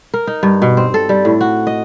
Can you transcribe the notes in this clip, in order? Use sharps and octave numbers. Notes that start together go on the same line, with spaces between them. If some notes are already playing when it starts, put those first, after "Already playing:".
A#4
D#4
G2
B2
C4
A4
G3
A2
F#4
D#5